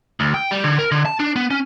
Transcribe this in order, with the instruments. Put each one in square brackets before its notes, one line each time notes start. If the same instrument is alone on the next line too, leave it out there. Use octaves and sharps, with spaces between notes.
[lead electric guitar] D2
G5
G3
D3
A#4
D3
A5
D4
B3
C#4